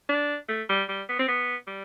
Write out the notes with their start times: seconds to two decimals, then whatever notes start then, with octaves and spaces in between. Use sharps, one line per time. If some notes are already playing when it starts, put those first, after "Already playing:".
0.09 D4
0.48 A3
0.69 G3
0.89 G3
1.09 B3
1.19 C4
1.28 B3
1.67 G3